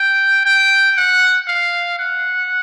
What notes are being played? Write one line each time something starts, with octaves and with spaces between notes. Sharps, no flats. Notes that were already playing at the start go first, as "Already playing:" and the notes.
Already playing: G5
G5
F#5
F5
F#5